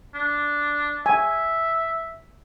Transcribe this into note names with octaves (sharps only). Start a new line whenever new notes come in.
D4
E5 G#5